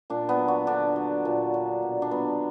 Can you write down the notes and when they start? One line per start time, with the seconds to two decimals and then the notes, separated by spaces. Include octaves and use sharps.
0.10 A#2 D4
0.29 B3
0.39 F#3
0.48 F#4
0.67 D3 D4
0.96 F#3
1.25 A#2
1.54 F#3
1.82 B2
2.02 D4
2.11 F#3 B3